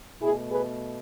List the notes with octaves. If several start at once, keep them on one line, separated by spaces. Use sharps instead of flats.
B2 A3 E4 G#4
G#4 B4